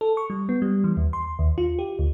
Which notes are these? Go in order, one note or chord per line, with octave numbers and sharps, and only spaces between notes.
A4
C#6
G3
B3
G3
E3
D#2
C6
D#2
F4
G4
D2